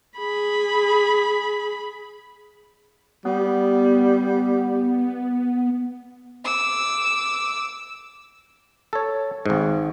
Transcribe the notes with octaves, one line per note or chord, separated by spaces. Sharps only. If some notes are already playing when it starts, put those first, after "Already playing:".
G#4 B5
G3 B3
D6 E6
A4 C#5
G#1 G#2